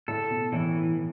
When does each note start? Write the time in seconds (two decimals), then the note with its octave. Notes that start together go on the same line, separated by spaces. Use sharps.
0.08 A2 A4
0.30 B2
0.52 A2 E3